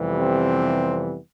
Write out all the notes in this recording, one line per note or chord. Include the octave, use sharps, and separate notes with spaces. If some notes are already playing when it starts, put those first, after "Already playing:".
Already playing: F2 C3 E3 G3 B3
C4